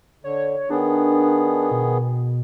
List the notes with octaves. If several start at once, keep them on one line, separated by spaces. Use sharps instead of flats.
D3 C#5
D#3 B3 D4 G#4
B2